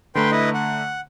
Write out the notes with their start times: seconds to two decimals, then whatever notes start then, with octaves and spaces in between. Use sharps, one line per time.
0.15 D3 A3 B4 G5 A#5 C6
0.31 E4 B4 D#5
0.54 F#5